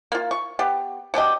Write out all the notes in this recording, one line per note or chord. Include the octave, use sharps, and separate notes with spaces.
A#3 F4
C#6
B3 G4
B2 D4 G4 D#5